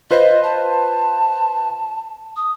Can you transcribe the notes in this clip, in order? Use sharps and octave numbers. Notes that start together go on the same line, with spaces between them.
F4 B4 C5 D#5
A5
D#6